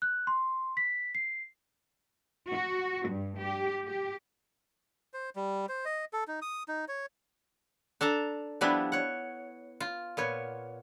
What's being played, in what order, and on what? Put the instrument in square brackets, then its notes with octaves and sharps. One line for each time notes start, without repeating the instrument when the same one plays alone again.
[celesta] F#6
C6
B6
C7
[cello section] F#4
G2
G4
G4
[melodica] C5
G3
C5
D#5
A4
D#4
D#6
D#4
C#5
[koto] D4 A4 A5 A#5
F3 G3 B3 D4 E4
C#5 F#5
F4
A#2 B3 C#5